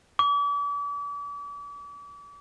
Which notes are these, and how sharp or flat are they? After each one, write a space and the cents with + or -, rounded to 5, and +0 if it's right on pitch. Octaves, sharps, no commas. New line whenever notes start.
D6 -40